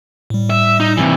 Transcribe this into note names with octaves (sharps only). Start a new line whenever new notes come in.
A2 G3
E5
D#4
C3 E3